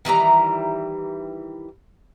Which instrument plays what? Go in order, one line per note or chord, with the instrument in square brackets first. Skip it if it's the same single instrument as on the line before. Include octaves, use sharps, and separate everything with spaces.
[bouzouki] D#3 E3 G3 A#5